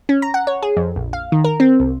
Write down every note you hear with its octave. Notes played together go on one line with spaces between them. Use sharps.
C#4
A#5
F#5
C#5
G#4
F2
A#1
F5
D#3
A#4
C4
C2